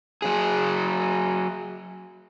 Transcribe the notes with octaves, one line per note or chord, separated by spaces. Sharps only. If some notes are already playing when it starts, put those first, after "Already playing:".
F#3 G#4